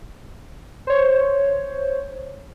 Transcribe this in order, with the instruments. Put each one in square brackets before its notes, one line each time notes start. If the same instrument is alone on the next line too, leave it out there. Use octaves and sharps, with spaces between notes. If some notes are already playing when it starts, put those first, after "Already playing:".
[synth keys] C5 C#5